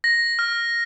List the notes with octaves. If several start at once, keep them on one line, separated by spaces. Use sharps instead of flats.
A#6
F6